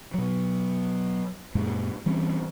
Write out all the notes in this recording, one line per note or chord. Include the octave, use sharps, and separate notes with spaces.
B2 F#3
F#2 A#2 G#3 A#3
E3 G3 C4 C#4